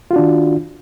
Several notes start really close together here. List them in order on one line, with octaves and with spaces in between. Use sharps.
F4 F#4 D4 D#3